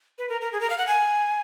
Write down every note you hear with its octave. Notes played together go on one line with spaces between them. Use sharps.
B4
A#4
A#4
G#4
A#4
F5
F#5
G#5